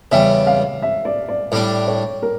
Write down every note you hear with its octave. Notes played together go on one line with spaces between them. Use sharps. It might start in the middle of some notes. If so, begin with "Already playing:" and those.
E2 C#3 G3 E5
F5
E5
D5
D5
A2 G3 D4 D5
C#5
A#4